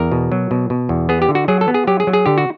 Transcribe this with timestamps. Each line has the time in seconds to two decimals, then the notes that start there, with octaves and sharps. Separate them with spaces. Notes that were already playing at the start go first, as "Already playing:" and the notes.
Already playing: E2 A#4
0.12 B2
0.32 F#3
0.51 B2
0.70 B2
0.89 E2
1.09 B3 G#4
1.22 G4
1.29 D3
1.35 F#4
1.48 F#3 G#4
1.61 A4
1.68 B3
1.74 G#4
1.87 F#3 G4
2.00 G#4
2.07 F#3
2.13 G#4
2.26 D3 G4
2.38 F#4